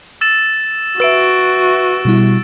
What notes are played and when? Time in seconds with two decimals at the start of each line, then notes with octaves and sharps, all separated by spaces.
0.21 E6 A6 E7
1.00 F#4 B4 E5 E6 D7
2.05 B2 G3 E4